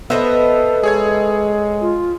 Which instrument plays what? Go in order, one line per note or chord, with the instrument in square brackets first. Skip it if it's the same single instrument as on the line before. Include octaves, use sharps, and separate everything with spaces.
[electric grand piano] B3 C5 [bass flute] A4 [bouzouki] B4 D#5 E5
[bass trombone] G#3 [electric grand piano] G#4 C#5 G#6
[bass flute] F4